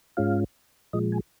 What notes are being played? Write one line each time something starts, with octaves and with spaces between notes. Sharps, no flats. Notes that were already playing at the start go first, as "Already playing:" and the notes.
G#2 G#3 C#4 F4 F5
A#2 F3 G#3 D#5
G#5